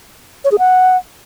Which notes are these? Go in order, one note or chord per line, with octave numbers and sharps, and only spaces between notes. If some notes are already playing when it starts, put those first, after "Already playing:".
C#5
G#4
F#5